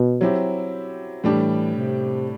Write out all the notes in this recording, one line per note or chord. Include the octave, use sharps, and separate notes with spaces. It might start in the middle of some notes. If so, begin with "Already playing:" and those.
Already playing: B2
F#3 C4 E4 G4
A2 E3 G3 D4 G4
C3